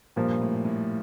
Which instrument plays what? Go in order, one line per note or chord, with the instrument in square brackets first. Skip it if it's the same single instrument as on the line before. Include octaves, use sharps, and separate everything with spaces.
[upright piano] G2 [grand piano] A#2 F3 A#3
[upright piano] A2
A2